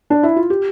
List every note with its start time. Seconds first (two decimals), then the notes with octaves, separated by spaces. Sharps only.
0.10 D4
0.23 E4
0.36 F4
0.50 G4